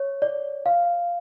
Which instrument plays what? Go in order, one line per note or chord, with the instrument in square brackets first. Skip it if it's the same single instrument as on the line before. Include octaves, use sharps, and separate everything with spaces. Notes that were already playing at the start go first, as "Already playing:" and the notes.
Already playing: [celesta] C#5
D5
F5